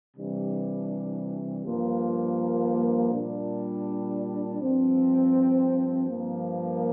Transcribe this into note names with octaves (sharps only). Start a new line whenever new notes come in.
C3 E3 G3 D4
G2 F3 A#3 F4
A#2 G3 D4
G2 F3 C4
G2 F3 A#3